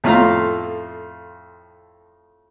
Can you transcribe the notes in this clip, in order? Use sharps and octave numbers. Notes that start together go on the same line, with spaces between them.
F2 A2 A3 F4 F5 A#5